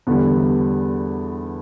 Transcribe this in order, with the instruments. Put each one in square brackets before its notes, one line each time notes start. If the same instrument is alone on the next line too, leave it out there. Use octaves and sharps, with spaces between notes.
[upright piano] E2 D3 G3 B3